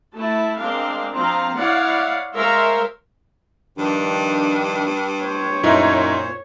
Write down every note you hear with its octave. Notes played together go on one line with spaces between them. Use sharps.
A3 E4 A5
G#3 C4 D4 A#4 F5
F3 C4 F5 A#5
E4 C#5 D5 F5 F#5
G#3 A#4 C5 C#5 E5 F5
G2 D#3 F3 D4
C5 C#5
F#2 A#2 D#4 E4 C5